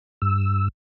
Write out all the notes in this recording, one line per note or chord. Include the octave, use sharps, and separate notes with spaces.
G2 E6